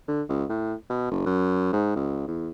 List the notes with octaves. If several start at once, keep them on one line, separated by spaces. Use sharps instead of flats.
D3
C#2
A2
B2
F#1
F#2
G#2
C#2
E2